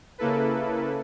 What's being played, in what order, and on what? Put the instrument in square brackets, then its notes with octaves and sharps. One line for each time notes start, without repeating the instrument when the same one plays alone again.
[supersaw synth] C#3 A#3 E4 A4 B4